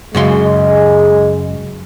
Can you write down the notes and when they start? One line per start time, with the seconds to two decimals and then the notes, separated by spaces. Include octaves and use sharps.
0.15 F#2 C#3 G#3 C6